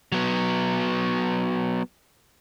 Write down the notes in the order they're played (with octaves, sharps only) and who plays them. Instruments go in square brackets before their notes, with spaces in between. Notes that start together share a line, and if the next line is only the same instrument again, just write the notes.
[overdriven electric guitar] F#3 B3